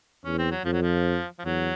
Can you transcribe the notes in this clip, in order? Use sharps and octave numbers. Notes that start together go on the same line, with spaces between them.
E2 C#4
C4
F#3
F2 F3
F#3
F3
F3
E2 F#3